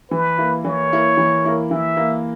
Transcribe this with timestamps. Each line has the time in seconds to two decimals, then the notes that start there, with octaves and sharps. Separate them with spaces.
0.11 E3 B4
0.38 A#3 E4 A#4
0.65 E3 C#5
0.91 A#3 E4 A#4
1.18 E3
1.44 A#3 E4 A#4
1.71 E3 E5
1.97 A#3 E4 A#4